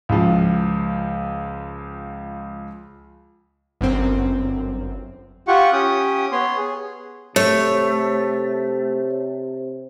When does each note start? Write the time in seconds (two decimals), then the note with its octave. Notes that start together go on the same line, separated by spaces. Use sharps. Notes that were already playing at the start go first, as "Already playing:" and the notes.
0.09 C#2 F3
3.81 G1 F#2 C4
5.48 F4 G4 F#5 C#6
5.73 C#4 G4 D#6
6.32 B3 C#5 C6
6.57 G#4
7.36 C3 A3 C#5